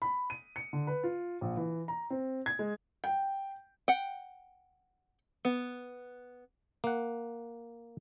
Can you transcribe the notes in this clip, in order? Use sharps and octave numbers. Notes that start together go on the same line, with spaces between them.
B5
D#7
C#7
D3
B4
F4
A#1
E3
A#5
C4
G#6
G#3
G5
F#5 G5
B3
A#3 F#5